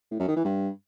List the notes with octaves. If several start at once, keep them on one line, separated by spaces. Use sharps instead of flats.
A2
F#2
D#3
E3
G2